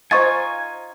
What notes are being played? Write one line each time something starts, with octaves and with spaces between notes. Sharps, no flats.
D#4 F4 C5 F5 G#5 C#6 A6